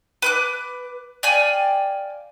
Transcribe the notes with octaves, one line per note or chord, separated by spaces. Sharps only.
B4 D6 F#6
D5 F5 G5 G#5